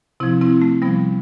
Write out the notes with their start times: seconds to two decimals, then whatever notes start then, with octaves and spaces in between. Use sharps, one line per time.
0.20 C3 F3 C4 E4
0.41 C4 E4
0.62 A3
0.82 C3 F3 G3 B3